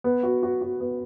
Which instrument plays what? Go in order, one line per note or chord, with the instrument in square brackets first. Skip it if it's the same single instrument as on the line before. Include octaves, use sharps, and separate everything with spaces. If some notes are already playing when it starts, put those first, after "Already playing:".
[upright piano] B3
F#4
F#4
F#4
B3